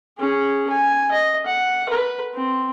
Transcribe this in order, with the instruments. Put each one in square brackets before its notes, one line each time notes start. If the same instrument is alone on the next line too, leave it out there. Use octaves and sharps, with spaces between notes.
[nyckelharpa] C#4 G#4
G#5
D#5
F#5
B4
C4